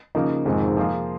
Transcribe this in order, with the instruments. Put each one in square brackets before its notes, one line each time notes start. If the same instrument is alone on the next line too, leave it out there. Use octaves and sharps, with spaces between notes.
[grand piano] C#3 F3 A#3 D#4
[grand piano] F2 C3 D#3 G#3 [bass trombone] G#2
[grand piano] F3 A#3 F4 G#4